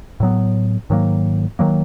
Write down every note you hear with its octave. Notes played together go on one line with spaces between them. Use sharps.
A2 F#3 B3
G#2 D#3 F#3 A#3
D#3 F#3 A#3